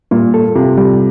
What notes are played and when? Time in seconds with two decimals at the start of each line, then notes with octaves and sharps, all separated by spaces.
0.11 A#2 G3
0.34 A4
0.55 C3 F4
0.78 G3